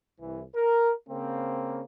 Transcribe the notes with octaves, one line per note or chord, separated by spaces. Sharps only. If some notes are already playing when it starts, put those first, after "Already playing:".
C2 E3
A#4
C#3 A#3 C4